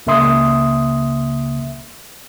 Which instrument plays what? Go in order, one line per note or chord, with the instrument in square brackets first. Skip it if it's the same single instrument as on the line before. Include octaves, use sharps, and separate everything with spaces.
[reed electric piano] C#2 C#3 A#3 E5 C6 D#6